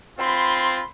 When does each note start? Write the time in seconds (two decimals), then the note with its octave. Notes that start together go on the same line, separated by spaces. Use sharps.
0.19 C4 F4 B5 C6